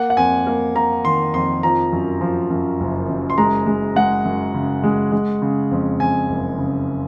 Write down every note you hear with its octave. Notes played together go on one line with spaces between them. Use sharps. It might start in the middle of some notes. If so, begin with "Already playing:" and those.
Already playing: A#3 F#5
F#5
F2 G#5
A#3
A#3 A#5
D#3 C6
F2 C6
F3 A#5
F#2
F3
F#2
F#1
F#2
C6
G#3 A#5
G#3
G#3 F#5
F#2
C#3
G#3
G#3
C#3
F2
F2 G#5
F#1
C#3